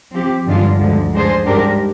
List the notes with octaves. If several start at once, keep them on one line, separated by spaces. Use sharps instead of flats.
F3 C4 G4
G2 D3 G#3 D4 F4
D2 D3 F3 G#3
D3 G#3 D4 G#4 C5
G#2 G3 D4 G4 A#4